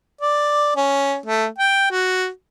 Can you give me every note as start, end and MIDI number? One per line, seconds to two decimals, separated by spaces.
0.21 0.73 74
0.76 1.16 61
1.26 1.46 57
1.58 1.87 79
1.91 2.28 66